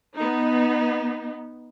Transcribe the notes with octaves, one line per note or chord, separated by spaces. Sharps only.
B3 D#4